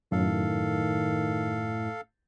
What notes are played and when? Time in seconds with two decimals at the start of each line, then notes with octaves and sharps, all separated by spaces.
0.12 F#2 A2 D#3 A4 F5